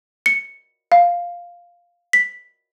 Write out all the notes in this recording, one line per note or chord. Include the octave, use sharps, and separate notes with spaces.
C#7
F5
B6